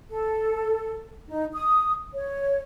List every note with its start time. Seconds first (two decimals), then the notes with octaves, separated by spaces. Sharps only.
0.09 A4
1.30 D#4
1.53 D#6
2.14 C#5